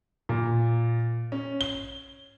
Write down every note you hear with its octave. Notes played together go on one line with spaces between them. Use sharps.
A#2
C#4
G7